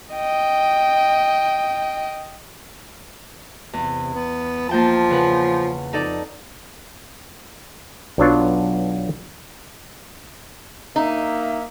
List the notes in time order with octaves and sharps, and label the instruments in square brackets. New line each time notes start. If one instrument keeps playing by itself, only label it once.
[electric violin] D#5 G5
[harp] E2 [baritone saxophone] C3
[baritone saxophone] B3
[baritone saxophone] F3 [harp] A#3 G5 A5
[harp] C#3 B4 F#5
[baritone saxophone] F2 [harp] D#4 A4 D5
[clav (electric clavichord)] B1 F#3 B3 D4 F4 C#5
[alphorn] A#3 [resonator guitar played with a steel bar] D#4 [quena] E5